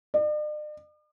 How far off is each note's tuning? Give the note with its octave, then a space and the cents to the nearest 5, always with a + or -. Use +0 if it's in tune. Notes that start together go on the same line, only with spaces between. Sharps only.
D5 +45